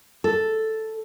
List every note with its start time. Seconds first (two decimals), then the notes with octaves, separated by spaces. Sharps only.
0.24 A4